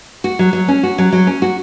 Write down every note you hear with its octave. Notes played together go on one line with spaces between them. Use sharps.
F#4
F#3
F#3
C#4
F#4
F#3
F#3
C#4
F#4